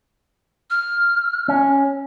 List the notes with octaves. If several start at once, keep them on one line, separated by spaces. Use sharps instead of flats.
F6
C#4